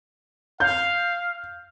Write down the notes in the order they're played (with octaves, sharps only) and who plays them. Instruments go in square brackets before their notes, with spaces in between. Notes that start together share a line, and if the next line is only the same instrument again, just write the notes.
[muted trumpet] F5 [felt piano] G6